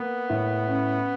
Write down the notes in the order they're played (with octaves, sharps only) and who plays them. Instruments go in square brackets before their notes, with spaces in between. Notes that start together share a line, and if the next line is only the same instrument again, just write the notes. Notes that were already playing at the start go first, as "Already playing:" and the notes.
Already playing: [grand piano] A#3 [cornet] B3
[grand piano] A2
C#4